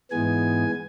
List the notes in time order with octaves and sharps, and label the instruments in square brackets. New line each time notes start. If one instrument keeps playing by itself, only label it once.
[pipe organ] G#2 E3 G#3 B3 G#5